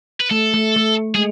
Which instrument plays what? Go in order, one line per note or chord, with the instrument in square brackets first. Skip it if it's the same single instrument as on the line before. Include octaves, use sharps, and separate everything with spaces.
[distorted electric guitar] B4
[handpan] A3 [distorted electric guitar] A4
[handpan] A3
A3
[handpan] G#3 [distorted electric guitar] G#4